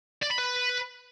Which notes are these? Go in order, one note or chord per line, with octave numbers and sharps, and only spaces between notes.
D5
B5
B4